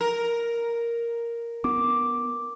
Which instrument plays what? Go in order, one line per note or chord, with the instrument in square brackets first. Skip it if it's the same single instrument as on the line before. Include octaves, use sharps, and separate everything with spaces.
[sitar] A#4
[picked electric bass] B3 [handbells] D6